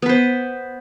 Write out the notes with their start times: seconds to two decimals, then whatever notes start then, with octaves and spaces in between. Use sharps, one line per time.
0.02 B3
0.06 B4
0.09 C5